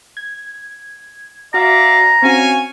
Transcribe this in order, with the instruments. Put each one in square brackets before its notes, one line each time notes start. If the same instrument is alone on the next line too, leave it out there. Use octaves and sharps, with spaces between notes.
[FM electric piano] G#6
[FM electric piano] F#4 [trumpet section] D5 E5 F5 [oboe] A#5
[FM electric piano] C4 C#4 F#4 [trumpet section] C#5 F5 G#5